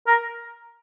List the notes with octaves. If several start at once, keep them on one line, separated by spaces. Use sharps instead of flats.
A#4